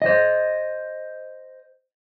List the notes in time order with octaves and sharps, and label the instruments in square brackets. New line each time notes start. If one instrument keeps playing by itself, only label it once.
[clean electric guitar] C5 D#5